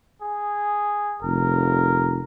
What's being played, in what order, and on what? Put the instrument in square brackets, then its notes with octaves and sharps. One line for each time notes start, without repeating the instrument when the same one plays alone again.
[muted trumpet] G#4
[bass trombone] F1 [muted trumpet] A#4